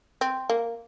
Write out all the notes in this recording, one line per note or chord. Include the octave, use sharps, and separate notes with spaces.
C4
A#3